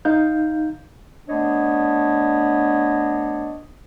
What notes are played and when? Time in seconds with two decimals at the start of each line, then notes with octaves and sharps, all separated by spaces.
0.05 D#4 F5 G6
1.28 A3 B3 D4 C#5 D#5 A5